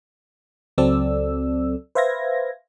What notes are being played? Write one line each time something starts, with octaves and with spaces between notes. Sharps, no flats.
C#2 F#3 C4 A4 D5 E6
B4 C5 E5 F5 G#6 A#6